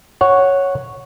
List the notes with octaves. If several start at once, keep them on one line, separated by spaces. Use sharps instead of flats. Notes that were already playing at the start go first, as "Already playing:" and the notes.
C#5 F#5